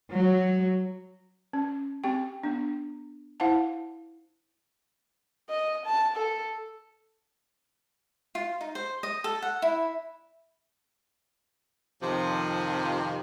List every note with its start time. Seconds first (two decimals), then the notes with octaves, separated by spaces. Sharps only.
0.12 F#3
1.53 C#4
2.04 C4 G4 G5
2.43 B3 D4
3.40 E4 C5 F5 F#5 A5
5.50 D#5
5.86 A5
6.17 A4
8.35 F4
8.61 D#4
8.75 C5
9.03 D#5
9.24 A4
9.42 F#5
9.62 E4
12.02 F2 C3 D#3 F3